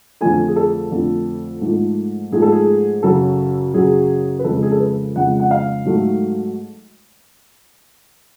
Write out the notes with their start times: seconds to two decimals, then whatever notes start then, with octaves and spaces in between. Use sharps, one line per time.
0.21 F2 D3 F3 A3 G#5
0.48 G#4
0.56 A4
0.91 F2 D3 F3 A3
1.61 G#2 F3 A3
2.32 G#2 F3 A3 G#4
2.42 A4
2.52 G#4
3.03 F#2 C#3 F#3 A4
3.74 F#2 C#3 F#3 G#4
4.39 B4
4.44 F2 C#3 G#3 A4
4.62 G#4
4.71 A4
4.80 B4
5.16 F2 C#3 G#3 F#5
5.40 F#5
5.51 F5
5.85 G#2 F#3 A3